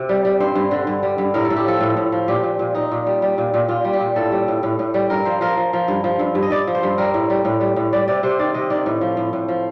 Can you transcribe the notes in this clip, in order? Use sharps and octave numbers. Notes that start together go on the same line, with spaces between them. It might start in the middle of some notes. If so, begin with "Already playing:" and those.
Already playing: C3
G3
G3
G2 C5
G2
D3
G2
G3
G2
A2 A#4
A4
A2
G4
F3 A4
A2
A2
F3
A#2 G4
A#2
A#2
A#2 D#4
A#2
G3
G3
A#2
A#2
A#2 F4
G3
G4
A#2
A2 A4
G3
A2
A2
A2
G3
G2 A#4
F3 C5
F3 A#4
F3
F3
G2
F3
G2
G2
D#5
G2 D5
F3
C5
G2
G3 A#4
A2
G3
A2
G3
A2
G3 D5
C3 D5
C3 C5
D#3 D5
C3 D#5
D#3 D5
A2
F3
A2
A2
F3